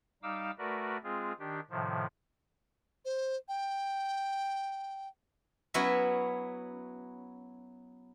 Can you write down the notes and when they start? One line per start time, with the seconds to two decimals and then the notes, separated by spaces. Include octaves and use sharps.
0.23 G3 D#4 F5 D6 E6
0.58 A3 F#4 A#4 B4 D5
1.04 G#3 C4 F4 G#4
1.39 D#3 D4 G4
1.70 A2 C3 D#3 F3
3.05 C5
3.48 G5
5.74 F#3 B3 C#4 E4 F#4 E5